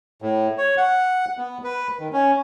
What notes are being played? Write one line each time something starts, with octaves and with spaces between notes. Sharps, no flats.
A2
C#5
F#5
B3
B4
D#3
C#4